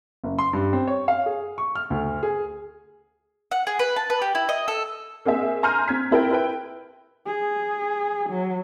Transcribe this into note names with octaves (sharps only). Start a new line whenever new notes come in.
F#1
C6
G2
C4
C#5
F5
G#4
C#6
F6
D2
G#4
F#5
G#4
B4
A5
B4
G4
E4
D#5
A4
A#3 C4 G#4 D#5 E5
G#5 A#5 C6 F6 G6 D#7
C4 G#6 B6
C4 E4 A#4 G5
E4 B4 G5
G#4
F#3